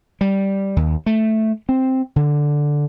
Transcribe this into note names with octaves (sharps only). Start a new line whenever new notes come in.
G3
D#2
A3
C4
D3